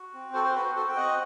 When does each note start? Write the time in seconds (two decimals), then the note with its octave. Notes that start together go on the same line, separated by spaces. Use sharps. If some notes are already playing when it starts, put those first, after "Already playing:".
Already playing: F#4
0.14 C4
0.33 F#4 A4 C5
0.44 C5
0.54 F#4 B4
0.75 F#4 A4 C5
0.89 G5
0.96 C4 D#5 F#5